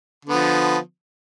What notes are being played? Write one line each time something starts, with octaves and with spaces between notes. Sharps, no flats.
D3 F3 B3